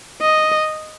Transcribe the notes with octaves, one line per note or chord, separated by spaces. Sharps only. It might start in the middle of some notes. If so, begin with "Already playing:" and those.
D#5